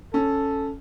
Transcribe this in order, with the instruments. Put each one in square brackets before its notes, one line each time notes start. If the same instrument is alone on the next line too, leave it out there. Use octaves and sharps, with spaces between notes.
[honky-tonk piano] C#4 [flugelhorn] A4